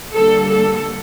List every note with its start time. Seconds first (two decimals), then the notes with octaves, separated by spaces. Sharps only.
0.14 D3 G3 A#3 A4
0.49 A4